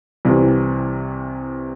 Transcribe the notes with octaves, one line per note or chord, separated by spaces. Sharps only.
C2 C3 E3